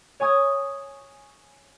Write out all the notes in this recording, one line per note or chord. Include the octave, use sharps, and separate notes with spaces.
C#5 G#5 C#6 D#6 G#6